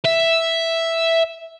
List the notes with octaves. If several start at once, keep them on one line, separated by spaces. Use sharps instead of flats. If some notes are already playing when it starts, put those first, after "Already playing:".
E5